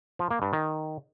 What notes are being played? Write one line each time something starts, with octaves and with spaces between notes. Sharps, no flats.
F3
A#3
G2
D#3